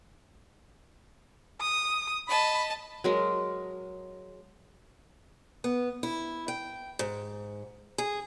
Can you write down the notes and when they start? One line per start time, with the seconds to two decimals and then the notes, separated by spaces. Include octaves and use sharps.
1.61 D#6
2.29 D#5 A5 B5
3.04 F#3 G#3 A#4
5.64 B3
6.03 E4
6.48 G5
6.99 G#2
7.98 G#4